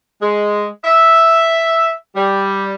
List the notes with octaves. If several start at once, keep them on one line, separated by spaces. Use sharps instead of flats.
G#3
E5
G3